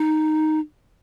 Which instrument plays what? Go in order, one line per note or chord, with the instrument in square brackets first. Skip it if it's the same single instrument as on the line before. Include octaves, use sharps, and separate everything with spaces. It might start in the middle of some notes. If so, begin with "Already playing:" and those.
Already playing: [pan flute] D#4